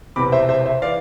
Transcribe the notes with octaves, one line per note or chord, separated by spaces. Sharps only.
E1 E2 C3 B5 D6
C5 E5
C5 E5
C5 E5
E3 D5 F5